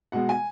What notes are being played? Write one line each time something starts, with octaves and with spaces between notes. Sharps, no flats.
B2 G#3 F#5
G#5